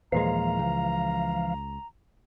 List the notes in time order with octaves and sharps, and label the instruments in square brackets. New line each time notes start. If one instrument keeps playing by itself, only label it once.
[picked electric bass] D#2 A#2 G#3 [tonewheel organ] E3 F3 F5 [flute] A#5
[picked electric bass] C#2